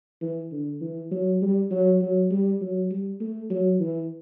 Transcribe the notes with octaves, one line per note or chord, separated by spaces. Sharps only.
E3
D3
E3
F#3
G3
F#3
F#3
G3
F#3
G3
A3
F#3
E3